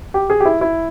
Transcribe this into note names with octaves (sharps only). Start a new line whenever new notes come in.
G4
G#4
G4
E4
E4